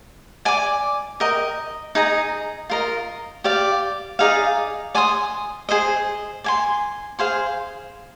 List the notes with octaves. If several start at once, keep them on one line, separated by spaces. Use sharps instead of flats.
D5 G#5 D6
A#4 D#5 G5
D#4 G#4 D#5 A#5
F4 A#4 D#5 A#5
G4 D5 F5
D#4 G#4 D5 F5
D5 G#5 C6 D#6
G#4 C5 D#5
D5 G#5 C6
G#4 C5 F5 C6